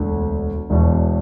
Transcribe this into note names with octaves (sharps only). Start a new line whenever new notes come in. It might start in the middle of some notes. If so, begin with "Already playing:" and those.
Already playing: E1 D2 D3
E1 E2 B2